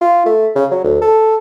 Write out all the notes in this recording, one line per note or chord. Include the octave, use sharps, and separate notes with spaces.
F4
A3
C#3
F#3
D2
A4